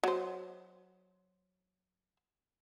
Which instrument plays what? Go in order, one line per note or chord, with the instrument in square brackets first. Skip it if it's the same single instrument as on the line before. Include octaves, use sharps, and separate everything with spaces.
[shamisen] F#3 C5